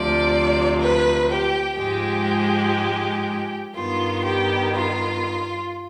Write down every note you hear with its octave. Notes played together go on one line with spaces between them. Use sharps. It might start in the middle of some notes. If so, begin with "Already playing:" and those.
Already playing: D2 C3 F3 D5
B4
G4
G#2 F3 G#3 G4
G2 D#3 B3 F4
G4
F4